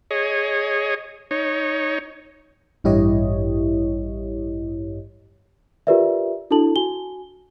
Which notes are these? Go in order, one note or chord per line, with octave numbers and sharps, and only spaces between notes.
G#4 C#5 D#5
D#4 C#5
A1 G2 E4 G4 C#5 D#5
F4 G4 A#4 B4 D5 E5
D4 E4 F#4 A4 A5 F#7
F#4 G#5 G7